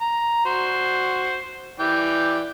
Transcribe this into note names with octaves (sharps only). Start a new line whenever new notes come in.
A#5
F#4 C5
E3 D5 G5